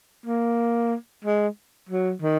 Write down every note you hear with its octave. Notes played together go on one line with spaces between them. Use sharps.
A#3
G#3
F#3
D#3